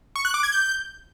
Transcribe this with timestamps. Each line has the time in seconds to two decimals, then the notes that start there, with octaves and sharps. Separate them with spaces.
0.16 C#6
0.25 F#6
0.34 D6
0.43 G#6
0.53 G6